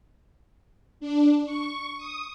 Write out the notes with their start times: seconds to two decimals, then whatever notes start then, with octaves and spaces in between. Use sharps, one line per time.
1.00 D4
1.45 C#6
1.97 D#6